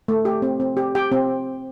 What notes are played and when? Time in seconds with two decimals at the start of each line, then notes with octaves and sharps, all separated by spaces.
0.08 A3
0.25 G4
0.42 C4
0.60 C4
0.77 G4
0.95 G4 G5
1.12 C4